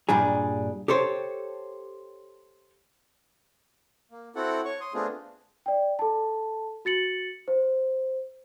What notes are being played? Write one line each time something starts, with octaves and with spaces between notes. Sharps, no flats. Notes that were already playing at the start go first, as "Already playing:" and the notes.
G2 A#2 G3 D4 G#4
G4 A4 C5 C#5
A#3
C4 E4 F#4 A4 F#5
C#5 C#6
C6 D#6
A3 B3 C4 D4 F4 G#4
D5 G5
A4 A5
F#4 A6 C#7 F#7
C5